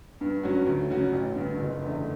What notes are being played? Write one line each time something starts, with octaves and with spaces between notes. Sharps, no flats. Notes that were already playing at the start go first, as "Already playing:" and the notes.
G2
F#3 C#4 F#4
D2
C#3 F#3 C#4 F#4
A1
G2 D3
F#1
E2 D3 A3